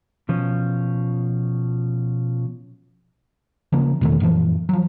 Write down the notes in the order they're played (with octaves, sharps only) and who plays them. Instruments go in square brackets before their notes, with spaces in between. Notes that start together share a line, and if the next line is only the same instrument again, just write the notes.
[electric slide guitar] B2 F3 C#4
[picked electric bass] C#3 F3 A#3
E2 B2 D#3 A3
F#2 A#2 E3 F3
F3 F#3